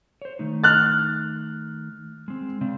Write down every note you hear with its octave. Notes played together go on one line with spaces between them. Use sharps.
C5 C#5
D#3 A3 D#4
F6 F#6 A6
G#3 C4
C#3 C4 D4